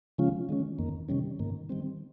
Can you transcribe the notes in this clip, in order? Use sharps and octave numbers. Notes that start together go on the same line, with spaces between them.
C#3 F3 G#3 C#4 F4
D#3 G#3 C#4
F2 D#3 A#3
C3 D#3 G3 C#4
G#2 D#3 A#3
D#3 G3 C4